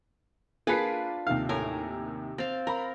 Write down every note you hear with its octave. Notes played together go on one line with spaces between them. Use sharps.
A#3 D4 F4 G#4 B4 D5 B6 C7
D#2 C3 D#3 F5
A2 A#4 G#5
C4 F5 A6
A#4 A#5 B5